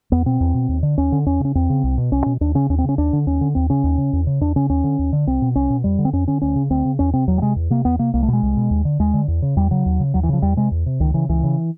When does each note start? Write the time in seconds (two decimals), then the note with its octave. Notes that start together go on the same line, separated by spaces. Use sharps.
0.12 E2 B3
0.26 B2 C4
0.40 E2
0.54 B2
0.69 D#2
0.83 D3
0.98 D#2 C#4
1.12 D3
1.26 E2 C#4
1.40 C#3 C#4
1.55 E2 C4
1.70 C#3
1.83 C2
1.98 B2
2.12 C2 C#4
2.26 B2
2.41 D#2 D4
2.55 C#3 C#4
2.69 D#2 C#4
2.79 C4
2.84 C#3 C#4
2.98 D#2 D4
3.13 D3
3.27 D#2 C#4
3.41 D3
3.55 D#2 C4
3.70 C#3 C#4
3.84 D#2
3.98 C#3
4.13 E2
4.27 C#3
4.41 E2 D4
4.56 C#3 C#4
4.70 D#2 C#4
4.84 D3
4.99 D#2
5.13 D3
5.27 C2 C4
5.42 B2
5.55 C2 C#4
5.70 B2
5.84 F2 G3
5.99 D3
6.05 C4
6.13 F2 C#4
6.27 D3 C#4
6.42 D2 C#4
6.56 C#3
6.70 D2 C4
6.85 C#3
6.99 E2 C#4
7.13 C3 C4
7.27 E2 F#3
7.38 G3
7.42 C3 G#3
7.56 E2
7.70 C3 A#3
7.85 E2 B3
7.99 C3 A#3
8.14 C2 A#3
8.23 A3
8.28 B2
8.33 G#3
8.42 C2
8.57 B2
8.70 D#2
8.85 D3
8.99 D#2 G#3
9.14 D3
9.28 E2
9.42 C#3
9.56 E2 G3
9.71 C#3 F#3
9.86 D#2
10.00 C#3
10.14 D#2 F#3
10.23 E3
10.29 C#3 F3
10.42 E2 G3
10.57 C3 G#3
10.71 E2
10.86 C3
11.00 C#2 D#3
11.14 C#3 E3
11.29 C#2 E3
11.43 C#3